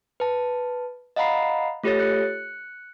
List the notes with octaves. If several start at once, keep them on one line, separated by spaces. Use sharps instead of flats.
B4 A5
D#5 F5 F#5 A#5 B5 C7
A3 F4 G4 A4 C#5 A6
F#6 C#7